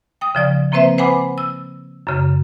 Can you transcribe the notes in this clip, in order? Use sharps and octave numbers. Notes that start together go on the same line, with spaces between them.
G5 D#6
C#3 F3 D5
F3 A#3 C4 B4 C5 E5
B4 C5 F#5 G#5 B5 D6
E6
F#2 C#3